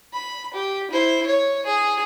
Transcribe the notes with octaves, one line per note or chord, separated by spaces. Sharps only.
B5
G4
E4 C5
C#5
G#4